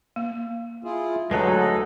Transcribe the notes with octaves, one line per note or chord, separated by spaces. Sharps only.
A#3
E4 F4 G#4
D2 F#3 G#3 D#4 A4 B4 F#5 A5